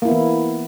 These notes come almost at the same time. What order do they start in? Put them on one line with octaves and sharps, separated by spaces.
A#3 E4 B3 E3